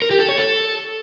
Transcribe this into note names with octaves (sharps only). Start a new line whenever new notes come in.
A#4
G4
A4
C#5
A4